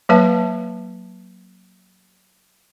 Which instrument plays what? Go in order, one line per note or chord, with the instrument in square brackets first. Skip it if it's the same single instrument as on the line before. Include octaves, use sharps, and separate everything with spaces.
[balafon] F#3 A#3 B4 E5 A5